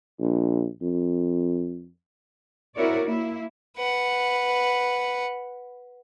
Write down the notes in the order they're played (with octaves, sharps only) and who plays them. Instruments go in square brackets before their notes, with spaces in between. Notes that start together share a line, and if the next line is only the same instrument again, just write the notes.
[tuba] A#1
F2
[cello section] C4 E4 F#4 A#4 C#5 D5
A#3 E4
[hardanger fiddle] B4 F#5